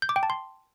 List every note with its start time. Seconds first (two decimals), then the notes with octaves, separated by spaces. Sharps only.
0.02 G6
0.09 D6
0.16 G5
0.23 A5
0.30 C6